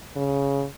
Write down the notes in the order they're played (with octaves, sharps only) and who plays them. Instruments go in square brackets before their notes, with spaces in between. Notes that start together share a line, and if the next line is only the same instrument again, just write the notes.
[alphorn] C#3